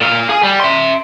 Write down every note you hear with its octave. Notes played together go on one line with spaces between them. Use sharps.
A#2 F5
G#4
G3
E5 C6